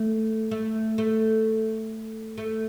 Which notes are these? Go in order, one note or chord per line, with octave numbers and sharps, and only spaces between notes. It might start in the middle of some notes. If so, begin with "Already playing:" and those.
Already playing: A3
A3
A3
A3